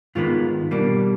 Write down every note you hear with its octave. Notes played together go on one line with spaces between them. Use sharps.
G#2 D#3 G#3 B3 F4
B2 G3 A#3 D4